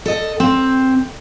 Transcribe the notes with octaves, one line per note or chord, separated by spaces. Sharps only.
A4 D#5
C4